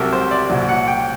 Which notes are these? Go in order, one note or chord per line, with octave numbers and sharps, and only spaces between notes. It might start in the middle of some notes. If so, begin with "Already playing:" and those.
Already playing: C2 C3 F#3 G4 A4 A#4
C5
D5
C2 A#2 F#3
F#5
G5